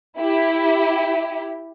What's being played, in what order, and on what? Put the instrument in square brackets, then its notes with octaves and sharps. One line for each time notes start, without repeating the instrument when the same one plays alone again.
[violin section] E4 G4